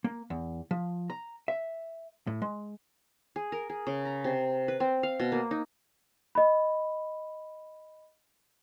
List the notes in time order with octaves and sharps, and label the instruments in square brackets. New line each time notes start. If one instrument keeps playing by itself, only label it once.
[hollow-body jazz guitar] A#3
E2
F3
A#5
E5
A2
G#3
[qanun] G#4
A#4
G#4
C#3
A#5
C3
B4
C4
F5
B2
A#3
D#4
[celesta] D#5 B5